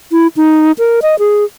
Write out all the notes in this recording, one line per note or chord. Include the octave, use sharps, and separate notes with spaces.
E4
D#4
A#4
D#5
G#4